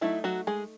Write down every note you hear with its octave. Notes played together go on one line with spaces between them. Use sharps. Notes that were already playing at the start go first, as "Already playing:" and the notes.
F#3 A3 D#4 E4
F#3 F#4
G#3 G#4